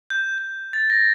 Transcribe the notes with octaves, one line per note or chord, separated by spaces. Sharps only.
G6
G6
A6
A#6